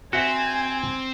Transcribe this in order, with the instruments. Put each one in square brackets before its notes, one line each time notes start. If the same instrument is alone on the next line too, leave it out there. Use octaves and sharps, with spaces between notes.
[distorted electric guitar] C4 [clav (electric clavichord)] F#4 E5 [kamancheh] G#5